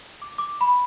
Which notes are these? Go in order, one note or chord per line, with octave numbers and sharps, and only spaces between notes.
D6
D6
B5